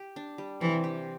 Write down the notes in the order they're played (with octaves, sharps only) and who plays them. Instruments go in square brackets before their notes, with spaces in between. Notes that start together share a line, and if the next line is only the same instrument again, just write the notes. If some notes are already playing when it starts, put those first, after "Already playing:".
Already playing: [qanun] G4
D4
G3
[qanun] C3 [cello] E3
[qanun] G4